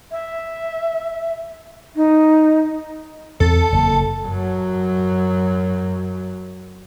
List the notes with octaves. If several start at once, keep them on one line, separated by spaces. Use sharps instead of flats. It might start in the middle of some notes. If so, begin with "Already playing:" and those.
E5
D#4
E2 C4 A4
F#1 A#3
F#2 F#3